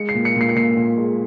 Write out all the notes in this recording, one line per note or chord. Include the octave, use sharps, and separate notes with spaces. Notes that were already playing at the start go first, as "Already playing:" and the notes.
Already playing: G#3 C#7
C7
A#2
C#7
A#2 C7
C#7
A#2 C7
A#2
G#3